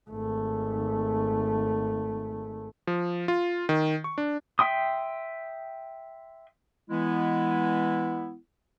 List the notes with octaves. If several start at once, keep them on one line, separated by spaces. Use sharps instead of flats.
G#1 A3
F3
F4
D#3
C#6
D4
E5 G5 C6 D#6
E3 G#3 B3 E4